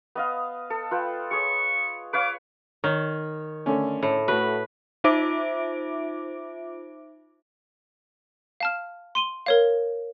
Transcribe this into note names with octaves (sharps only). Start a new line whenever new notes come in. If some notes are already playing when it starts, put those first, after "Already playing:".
B3 D#5 F5
A4
F4 B4 G5
G#4 C#5 C#6
B4 C#5 F5 D6
D#3 C#5
D3 A3 C#4
A2
A3 F#4 B4
D#4 F4 C5 E5 D6 D7
F5 A5 F6
C6 D#7 G7
A#4 C#5 F5